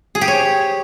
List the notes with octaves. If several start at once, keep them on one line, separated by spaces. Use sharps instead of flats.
G#4
G4
C#5